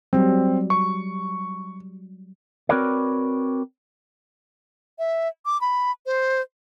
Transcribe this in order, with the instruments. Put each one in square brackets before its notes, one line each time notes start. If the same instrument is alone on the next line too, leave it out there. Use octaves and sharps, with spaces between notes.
[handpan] F#3 G3 [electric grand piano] C4
[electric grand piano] C#6
[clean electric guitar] C4 F#4 A#4 B4 C#5 D5
[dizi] E5
D6
B5
C5